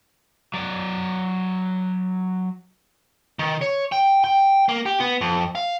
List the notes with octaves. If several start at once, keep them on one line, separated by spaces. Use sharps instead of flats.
F#3 D5
D#3
C#5
G5
G5
A#3
G4
B3
F2
F5